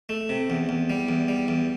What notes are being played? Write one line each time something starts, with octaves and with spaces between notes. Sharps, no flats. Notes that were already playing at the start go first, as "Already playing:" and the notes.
A3
C3
E2
E2
G3
E2
G3
E2